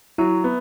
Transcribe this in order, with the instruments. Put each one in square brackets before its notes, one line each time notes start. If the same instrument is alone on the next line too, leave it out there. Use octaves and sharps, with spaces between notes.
[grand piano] F#3 [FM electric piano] E4
[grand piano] B3